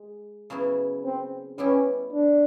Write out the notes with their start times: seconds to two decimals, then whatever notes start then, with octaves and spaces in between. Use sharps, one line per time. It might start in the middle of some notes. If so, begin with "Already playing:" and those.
Already playing: G#3
0.50 C#3 F#3 B3 E4
1.04 C4
1.58 G3 B3 C#4 E4 G4
2.13 D4